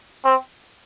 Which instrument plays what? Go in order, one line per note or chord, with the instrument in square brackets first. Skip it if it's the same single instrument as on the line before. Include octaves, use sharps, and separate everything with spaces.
[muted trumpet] C4